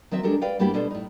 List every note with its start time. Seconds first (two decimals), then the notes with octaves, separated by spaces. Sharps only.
0.11 D#3 F#3 C4 E5
0.23 G#3 D4 G4 A4 A#4
0.41 B4 D5 F5 G5
0.59 G2 G3 A#3 B3 E4 G4
0.74 B2 D4 A4 C5
0.91 A2 D#4